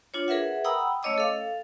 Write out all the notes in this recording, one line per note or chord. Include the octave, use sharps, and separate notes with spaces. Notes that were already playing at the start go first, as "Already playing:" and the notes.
D4 F4 C#5
G#4 A#4 B4 E5 F#5
F#5 G5 A#5 B5 D#6 E6
A3 C#4 C#5 D#5 D6 E6
A4 F5